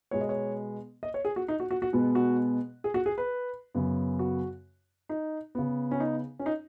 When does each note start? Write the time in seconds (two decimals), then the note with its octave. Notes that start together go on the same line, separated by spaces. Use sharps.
0.11 B2 G#3 B3 C#5
0.21 D#5
0.29 C#5
1.03 D#5
1.14 C#5
1.25 G#4
1.36 F#4
1.48 D#4
1.60 F#4
1.71 F#4
1.82 F#4
1.93 B2 G#3 B3
2.15 F#4
2.84 G#4
2.94 F#4
3.06 G#4
3.18 B4
3.75 F#2 C#3 B3
4.19 F#4
5.09 D#4
5.55 C#3 B3
5.91 C#4
6.00 D#4
6.39 C#4
6.46 D#4